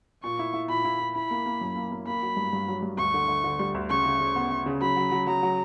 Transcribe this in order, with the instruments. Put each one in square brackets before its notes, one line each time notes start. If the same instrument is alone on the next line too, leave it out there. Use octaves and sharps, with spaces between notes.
[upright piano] A#2 [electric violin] C#6
[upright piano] E4
E4
[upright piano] A#2 [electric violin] B5
[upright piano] E4
E4
[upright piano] E4 [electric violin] B5
[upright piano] A#3
A#3
F#2
A#3
A#3
[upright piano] A#3 [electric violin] B5
[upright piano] F#3
G2
G2
F#3
G2
[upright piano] D2 [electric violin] C#6
[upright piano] D3
D3
D3
G3
D2
[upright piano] C#3 [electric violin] C#6
[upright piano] C#3
C#3
B3
B3
C#3
[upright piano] F#3 [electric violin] B5
[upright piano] F#3
F#3
[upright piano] F#3 [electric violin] A#5
[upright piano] F#3